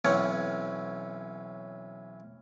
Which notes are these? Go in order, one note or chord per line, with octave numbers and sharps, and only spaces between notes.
B1 E3 C4 C#4 C#5 F#5